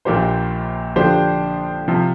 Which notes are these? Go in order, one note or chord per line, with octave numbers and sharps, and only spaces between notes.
A#1 A#2 A#3 G4 C5
D3 F3 D4 G4 C5
C3 F3